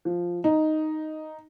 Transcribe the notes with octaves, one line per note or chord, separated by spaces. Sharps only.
F3
D#4